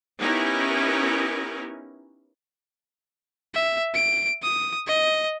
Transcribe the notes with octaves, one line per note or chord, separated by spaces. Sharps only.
B3 C#4 D#4 E4 G4 A#4
E5
D7
D#6
D#5